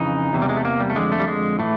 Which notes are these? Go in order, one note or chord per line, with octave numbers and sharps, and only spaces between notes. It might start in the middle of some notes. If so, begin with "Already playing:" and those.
Already playing: F2 C#3 E3 D#4
E2 C3 E3
G3
G#3
A3
A#3
G3
A3
F2 D3 G#3
A3
G3
G#3
A2 E3 A3